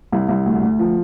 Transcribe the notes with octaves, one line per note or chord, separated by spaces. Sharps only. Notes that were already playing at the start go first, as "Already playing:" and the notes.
C2
C2
D2
D2
F3